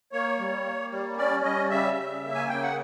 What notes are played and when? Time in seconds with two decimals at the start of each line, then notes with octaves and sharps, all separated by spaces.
0.12 A#3 C#5
0.40 G3
0.65 A#3
0.91 G3
1.17 C#4 D5
1.44 G3 D#5
1.70 C#3 E5
1.97 C#3
2.23 A#3
2.35 G#5
2.49 C#3 G5
2.62 F#5